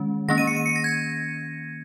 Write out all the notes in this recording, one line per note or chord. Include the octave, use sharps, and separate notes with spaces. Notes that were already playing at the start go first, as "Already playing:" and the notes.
Already playing: D#3 G#3 C#4
D#3 A#3 C#4 A#6
D#7
C#7
D#7
C#7
A#6
G#6